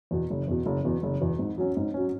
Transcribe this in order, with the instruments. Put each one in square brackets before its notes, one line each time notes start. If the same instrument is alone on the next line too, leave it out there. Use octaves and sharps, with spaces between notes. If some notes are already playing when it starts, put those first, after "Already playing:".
[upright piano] E2 B2
F#1
E2 B2
F#1
E2 B2
F#1
E2 B2
G#2
F#3 C#4
G#2
F#3 C#4